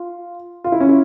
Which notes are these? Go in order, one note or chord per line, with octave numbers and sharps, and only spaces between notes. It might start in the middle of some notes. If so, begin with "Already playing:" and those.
Already playing: F4
F4
E4
C#4
E4